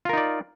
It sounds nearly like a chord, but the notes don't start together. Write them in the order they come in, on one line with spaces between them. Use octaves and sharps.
F4 A#4 D#4 D5